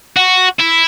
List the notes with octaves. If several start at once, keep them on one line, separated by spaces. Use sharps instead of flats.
F#4
E4